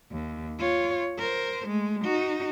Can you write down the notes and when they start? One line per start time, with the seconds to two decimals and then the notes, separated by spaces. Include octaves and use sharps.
0.12 D#2
0.59 F4 C#5
1.19 A#4 C5
1.67 G#3 A3
2.03 D#4 F#4